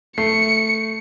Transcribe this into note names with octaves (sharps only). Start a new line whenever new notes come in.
A3 C7 C#7